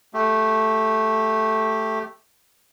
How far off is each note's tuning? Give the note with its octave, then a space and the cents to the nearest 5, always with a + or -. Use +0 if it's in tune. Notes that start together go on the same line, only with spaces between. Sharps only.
A3 +0 G4 +0